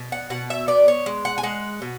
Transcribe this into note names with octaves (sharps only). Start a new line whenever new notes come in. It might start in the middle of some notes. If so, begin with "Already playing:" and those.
Already playing: B2
F#5
B2 F#5
E5
B3 D5
C#5
G#3
F#5
G#5
G#3 F#5
B2